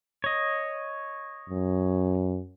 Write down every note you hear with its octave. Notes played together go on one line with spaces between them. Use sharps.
C#5 D#5
F#2